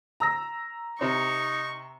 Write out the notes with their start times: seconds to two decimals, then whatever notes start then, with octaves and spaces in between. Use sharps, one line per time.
0.20 A#5 E6 A#6
1.01 C3 C4 D#4 C#6